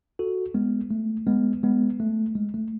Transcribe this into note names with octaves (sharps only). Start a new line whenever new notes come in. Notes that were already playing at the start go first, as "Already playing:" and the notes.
F#4 A4
G#3 B3
A3
G#3 B3
G#3 B3
A3
G#3
A3